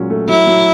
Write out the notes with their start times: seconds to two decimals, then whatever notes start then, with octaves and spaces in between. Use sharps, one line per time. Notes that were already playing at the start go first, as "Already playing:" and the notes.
Already playing: A#2 F#3 G#3 C#4
0.10 A3
0.29 F#3 E4
0.47 F#3